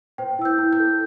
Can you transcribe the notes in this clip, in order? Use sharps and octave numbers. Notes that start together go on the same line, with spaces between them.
C5 G5
E4 E6
G6
E4
G6
A4